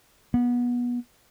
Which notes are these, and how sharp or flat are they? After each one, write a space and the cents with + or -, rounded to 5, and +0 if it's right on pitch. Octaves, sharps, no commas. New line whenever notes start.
B3 -25